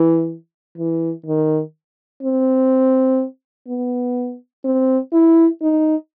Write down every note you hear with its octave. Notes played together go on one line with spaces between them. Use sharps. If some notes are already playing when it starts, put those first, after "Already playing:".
Already playing: E3
E3
D#3
C4
B3
C4
E4
D#4